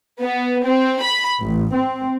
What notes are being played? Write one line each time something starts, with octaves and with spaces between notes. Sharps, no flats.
B3
C4
B5
A1
C4